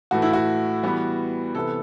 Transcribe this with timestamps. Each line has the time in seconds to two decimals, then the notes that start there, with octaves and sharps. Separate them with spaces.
0.11 A2 E3 A3 F#4
0.22 E4
0.33 F#4
0.83 E3 G3 B3
1.55 C3 E3 B3 A4